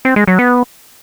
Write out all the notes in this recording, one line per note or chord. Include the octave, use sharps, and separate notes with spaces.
C4
G#3
F#3
B3